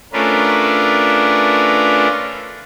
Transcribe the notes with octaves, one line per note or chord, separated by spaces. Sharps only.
A3 C#4 D4 F4 A#4 B4